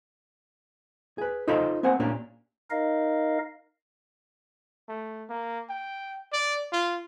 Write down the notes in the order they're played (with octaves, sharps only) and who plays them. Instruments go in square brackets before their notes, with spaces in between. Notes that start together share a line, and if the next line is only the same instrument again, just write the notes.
[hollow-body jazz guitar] G#4 B4
D#4 F4 A4 C5 D#5 B5
A#3 C4 C5 F#5 G#5
A#2 A#3 C#4 D4 G4
[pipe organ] D#4 A#4 D#5 F5
[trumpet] A3
A#3
G5
D5
F4